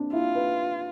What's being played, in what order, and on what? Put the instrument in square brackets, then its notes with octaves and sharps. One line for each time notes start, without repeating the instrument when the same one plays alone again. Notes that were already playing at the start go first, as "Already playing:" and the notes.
Already playing: [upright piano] C4 D4
[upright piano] E4 [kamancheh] F4
[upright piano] B4